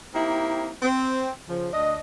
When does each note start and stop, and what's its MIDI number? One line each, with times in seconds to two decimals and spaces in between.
0.13 0.70 58
0.13 0.70 60
0.13 0.70 63
0.13 0.70 64
0.13 0.70 67
0.83 1.31 60
1.47 1.67 49
1.47 1.67 53
1.72 1.97 38
1.72 1.97 62
1.72 1.97 75